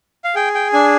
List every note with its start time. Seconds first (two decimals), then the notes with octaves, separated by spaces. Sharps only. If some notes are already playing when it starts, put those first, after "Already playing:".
0.24 F5
0.35 G#4 G5
0.55 G5
0.73 D4 G#5